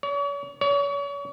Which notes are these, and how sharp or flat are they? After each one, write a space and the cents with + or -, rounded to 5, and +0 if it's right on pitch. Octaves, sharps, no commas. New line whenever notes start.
C#5 +40
C#5 +35